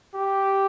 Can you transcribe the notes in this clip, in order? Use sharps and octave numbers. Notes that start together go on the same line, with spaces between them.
G4